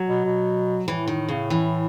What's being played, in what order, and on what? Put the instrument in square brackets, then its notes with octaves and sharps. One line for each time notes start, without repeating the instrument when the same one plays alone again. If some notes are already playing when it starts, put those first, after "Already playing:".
Already playing: [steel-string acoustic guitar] F#3
[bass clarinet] B2
B2
[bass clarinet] A2 [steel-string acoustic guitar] E3
[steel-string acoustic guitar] D#3
C#3
E3